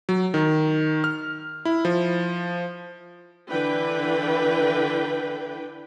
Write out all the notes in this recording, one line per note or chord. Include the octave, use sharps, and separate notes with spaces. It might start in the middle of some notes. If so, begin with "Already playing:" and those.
F#3
D#3
F6
E4
F3
D3 E3 D4 B4 G5